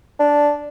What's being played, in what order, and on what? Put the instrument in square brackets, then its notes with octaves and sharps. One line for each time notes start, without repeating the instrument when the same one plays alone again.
[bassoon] D4